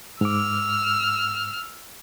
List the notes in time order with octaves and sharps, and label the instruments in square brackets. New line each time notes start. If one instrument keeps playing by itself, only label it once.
[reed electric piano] G#2 D6 [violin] E6 F6